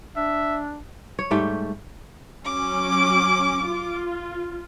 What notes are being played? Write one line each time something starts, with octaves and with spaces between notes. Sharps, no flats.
D4 E5
C#5
G#2 G3 A3 G5
F#3 C#4 D6
F4